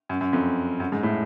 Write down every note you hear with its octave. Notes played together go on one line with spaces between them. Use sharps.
F#2
F#2
F2
F#2
G#2
A2